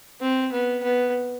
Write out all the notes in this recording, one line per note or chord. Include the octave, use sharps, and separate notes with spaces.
C4
B3
B3